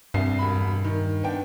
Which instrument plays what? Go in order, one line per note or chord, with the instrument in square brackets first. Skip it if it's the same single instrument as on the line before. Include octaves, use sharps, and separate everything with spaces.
[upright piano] C2 C7 [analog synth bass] G2
[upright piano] E1 B5
D#3
B3 D4 G5